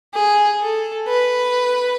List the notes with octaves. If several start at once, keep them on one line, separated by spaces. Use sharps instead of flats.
G#4
A4
B4